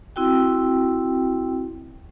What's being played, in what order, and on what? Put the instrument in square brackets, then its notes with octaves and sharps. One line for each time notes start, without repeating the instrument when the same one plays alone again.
[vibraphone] C4 E4 F#4 G5